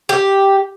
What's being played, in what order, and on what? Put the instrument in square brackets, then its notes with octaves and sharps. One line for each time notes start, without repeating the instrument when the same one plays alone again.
[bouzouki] G4